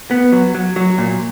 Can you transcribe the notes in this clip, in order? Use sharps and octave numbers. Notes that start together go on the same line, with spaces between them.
B3
F#3
F#3
F#3
A#2